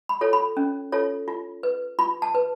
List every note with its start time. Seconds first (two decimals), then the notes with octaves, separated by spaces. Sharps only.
0.09 B5
0.21 F4 A4 C#5
0.33 B5
0.57 C#4
0.92 F4 A4 C#5
1.28 F4
1.63 B4
1.99 F4 B5
2.22 A5
2.35 B4